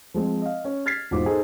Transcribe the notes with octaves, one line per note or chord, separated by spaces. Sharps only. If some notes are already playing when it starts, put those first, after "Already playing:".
F3 G#3 C4
D#5 F5
C#4
F6 G#6 A6 B6 C7
E1 G#2 F4 F#4 C5 D6
D#4 G#4 A4 C5